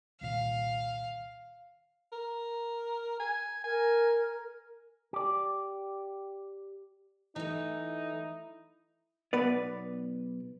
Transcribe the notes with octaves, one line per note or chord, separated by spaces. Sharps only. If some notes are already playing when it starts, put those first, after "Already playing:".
C2 A#2 D#3 F5
A#4
G#5
A#4 G#5
G4 D5
E3 A3 D#4 E4
B1 B3 B4 D5